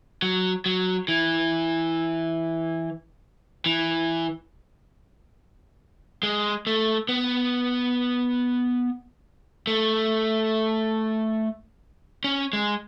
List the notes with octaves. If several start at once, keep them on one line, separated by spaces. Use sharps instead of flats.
F#3
F#3
E3
E3
G#3
A3
B3
A3
C#4
G#3